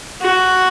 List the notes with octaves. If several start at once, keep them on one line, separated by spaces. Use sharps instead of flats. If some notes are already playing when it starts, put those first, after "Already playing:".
F#4